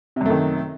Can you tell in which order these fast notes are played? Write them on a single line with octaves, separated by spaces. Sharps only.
C3 F#2 A3 D#3